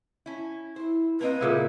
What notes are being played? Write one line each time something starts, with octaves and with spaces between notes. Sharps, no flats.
C#4 E4
E4 C5
A#3 C4 B4 D#5
A#2 C#3 E4